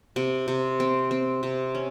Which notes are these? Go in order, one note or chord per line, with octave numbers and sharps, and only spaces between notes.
C3
C3
C4
C4
C3
C#4